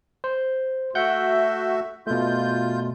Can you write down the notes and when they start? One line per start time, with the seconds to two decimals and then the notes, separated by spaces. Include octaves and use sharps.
0.24 C5
0.95 A3 F#4 E5 F#5 G6
2.07 B2 A3 F4 G6